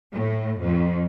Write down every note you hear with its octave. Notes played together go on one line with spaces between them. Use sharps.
A2
F2